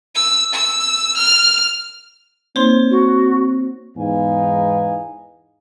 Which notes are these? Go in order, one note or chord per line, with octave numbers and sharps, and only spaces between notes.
E6
E6
F6
A#3 C4 D#4 C5 C#5 C6
F#4
E2 G#2 B3 D#4 F5 G#5